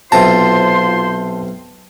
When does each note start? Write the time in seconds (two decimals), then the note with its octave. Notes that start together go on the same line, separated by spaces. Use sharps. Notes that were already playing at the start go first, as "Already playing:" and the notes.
0.12 B1 C3 F4 C5 A5 A#5 C6